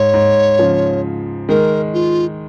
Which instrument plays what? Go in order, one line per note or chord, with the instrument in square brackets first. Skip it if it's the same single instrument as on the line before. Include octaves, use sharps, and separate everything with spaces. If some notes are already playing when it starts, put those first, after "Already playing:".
Already playing: [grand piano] G#2 [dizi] C#5
[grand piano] G#2
C#3 F3
[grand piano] D#3 G#3 [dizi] A#4
[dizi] F4